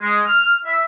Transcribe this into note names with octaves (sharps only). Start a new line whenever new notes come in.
G#3
F6
E5